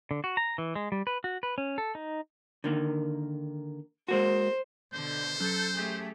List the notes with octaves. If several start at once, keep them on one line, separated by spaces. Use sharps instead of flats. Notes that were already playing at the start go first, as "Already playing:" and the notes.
D3
F#4
A#5
E3
G#3
G3
B4
F#4
B4
C#4
A4
D#4
D3 D#3 A#3
G#3 A#3 F#4 C5
B2 D3 C5 G6
F#3 C#4 A4 F#6
A3 G4 G#4